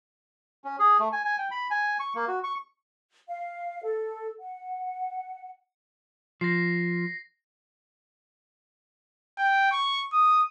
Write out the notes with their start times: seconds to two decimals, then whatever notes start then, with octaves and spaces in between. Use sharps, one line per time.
0.64 C#4
0.79 G#4
1.00 A3
1.12 G#5
1.24 G#5
1.38 G5
1.51 B5
1.71 G#5
2.00 C#6
2.15 A#3
2.28 F#4
2.44 C#6
3.28 F5
3.84 A4
4.40 F#5
6.41 F3 A#6 C7
9.38 G5
9.71 C#6
10.13 D#6